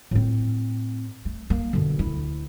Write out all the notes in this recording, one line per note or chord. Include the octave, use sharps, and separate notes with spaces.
A2 C4
A3
A#3
B2 D3
D2 E4